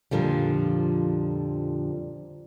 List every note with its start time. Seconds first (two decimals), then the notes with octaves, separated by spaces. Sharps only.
0.11 F2 A#2 D3 F3 G3